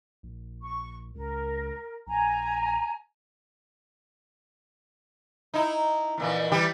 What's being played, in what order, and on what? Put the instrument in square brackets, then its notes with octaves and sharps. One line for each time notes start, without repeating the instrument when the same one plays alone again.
[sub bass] A#1
[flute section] C#6
[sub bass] C#2 [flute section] A#4
[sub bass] A#1 [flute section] G#5 A#5
[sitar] D#4 E4
F2 A#2 E3
E3 G3 G4